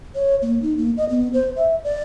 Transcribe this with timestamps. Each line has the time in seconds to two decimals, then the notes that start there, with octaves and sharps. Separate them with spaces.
0.15 C#5
0.42 A#3
0.62 D#4
0.77 A#3
0.97 D#5
1.09 B3
1.33 C5
1.56 E5
1.84 D5